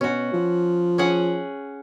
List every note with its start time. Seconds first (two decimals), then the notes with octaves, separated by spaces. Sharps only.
0.01 B2 C#4 F#4
0.33 F3
0.98 C#4 G#4 F#5